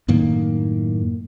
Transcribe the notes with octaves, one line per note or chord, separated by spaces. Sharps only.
F#2 A2 D#3 A#3